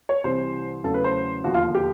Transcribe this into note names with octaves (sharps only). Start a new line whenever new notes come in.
C#5
C2 C3 E3 G3 C5
E2 C#3 F#3 A3 A4
B4
C5
E1 D#2 D3 F3 F#4
F4
G4